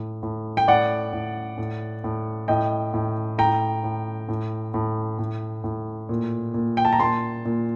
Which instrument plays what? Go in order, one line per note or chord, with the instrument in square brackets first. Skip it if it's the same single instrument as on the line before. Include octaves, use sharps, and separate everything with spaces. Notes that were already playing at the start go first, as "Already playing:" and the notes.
Already playing: [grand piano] A2
A2
G5
A2 D5 F#5
A2
A2
A2
A2 D#5 G5
A2
A2 G5 A#5
A2
A2
A2
A2
A2
A#2
A#2
G5
A5
A#5
A#2 A5 C6
A#2